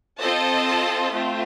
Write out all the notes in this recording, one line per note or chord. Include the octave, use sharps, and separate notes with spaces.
C4 F4 A4 D#5 A5
A3 C4 F4